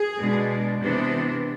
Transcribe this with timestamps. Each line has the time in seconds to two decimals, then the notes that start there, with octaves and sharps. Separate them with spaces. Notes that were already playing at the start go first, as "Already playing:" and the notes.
Already playing: G#4
0.18 B2 G#3 D4
0.81 C3 E3 B3 D4